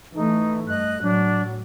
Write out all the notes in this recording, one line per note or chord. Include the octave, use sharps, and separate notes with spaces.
E3 A3 D#4
G2 D#5 F#6
A2 F#3 D4